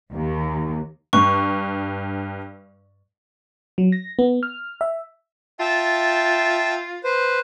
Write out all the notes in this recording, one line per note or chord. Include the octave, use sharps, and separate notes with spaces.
D#2
G2 C#6
F#3
A#6
B3
F6
E5
F4 E5 G5 A5
B4 C5